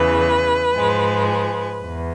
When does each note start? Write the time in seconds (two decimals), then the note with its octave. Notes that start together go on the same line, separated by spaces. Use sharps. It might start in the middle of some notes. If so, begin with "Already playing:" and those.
Already playing: E2 C#3 E3 B4
0.74 G#2 F3 G#3
1.30 B4
1.84 E2